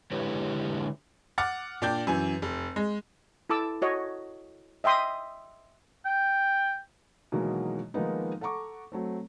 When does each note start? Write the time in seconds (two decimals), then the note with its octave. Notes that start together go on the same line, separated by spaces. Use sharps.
0.12 D3 G#3 E4 G4 B4 C#5
1.38 F#5 D6 F6 A6
1.82 A#2 D4 D5 G5 G6
2.07 F#2 E3 G#5
2.42 F1
2.76 G#3
3.50 E4 A4 A5 D6 E6
3.82 F#4 C#5 D#5
4.84 D#5 E5 G5 C6 D#6
6.05 G5
7.32 B2 D#3 E3 F#3 G#3 A#3
7.94 D#3 F3 G#3 A#3 B3 D#4
8.41 A4 F#5 A#5 C#6 D6
8.92 F#3 A3 C4